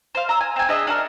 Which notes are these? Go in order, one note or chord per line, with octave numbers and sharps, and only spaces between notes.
C5 F5
A#5 E6
G#5
C4 G#5
D4 G#4 D#5 E5
D4 F#4 A#4